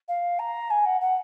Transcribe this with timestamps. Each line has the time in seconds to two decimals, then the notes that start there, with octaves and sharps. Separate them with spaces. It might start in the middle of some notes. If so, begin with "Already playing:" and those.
0.08 F5
0.39 A#5
0.70 G#5
0.86 F#5
1.01 F#5